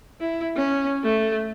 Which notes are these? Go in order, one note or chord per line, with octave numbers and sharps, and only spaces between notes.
E4
C#4
A3